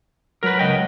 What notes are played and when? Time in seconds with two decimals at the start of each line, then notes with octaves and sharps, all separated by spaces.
0.43 F#3 A#4 B4
0.59 C#2 D#5 G5